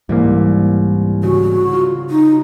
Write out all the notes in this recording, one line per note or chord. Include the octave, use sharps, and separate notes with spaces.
C2 G#2 E3 A#3
C#3 F#4
F4
D#4